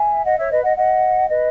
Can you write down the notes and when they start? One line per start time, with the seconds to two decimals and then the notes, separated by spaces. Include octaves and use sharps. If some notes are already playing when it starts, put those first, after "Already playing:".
Already playing: E5 G#5
0.24 D#5 F#5
0.37 C#5 E5
0.51 B4 D#5
0.63 D#5 F#5
0.76 D#5 F#5
1.28 B4 D#5